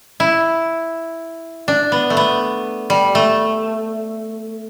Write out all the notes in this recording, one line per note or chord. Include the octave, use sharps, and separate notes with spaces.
E4
D4
B3
A3
B3
G3
A3